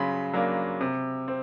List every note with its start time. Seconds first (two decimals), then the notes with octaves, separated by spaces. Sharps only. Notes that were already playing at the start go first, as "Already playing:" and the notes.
Already playing: C#3 F#3 B5 C6
0.33 F#3 A#3 D4
0.81 C3
1.28 C4